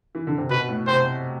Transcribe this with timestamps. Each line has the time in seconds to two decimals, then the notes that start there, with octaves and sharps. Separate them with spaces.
0.15 E3
0.27 D3
0.38 C3
0.50 B2 B4
0.69 A2
0.87 C3 C5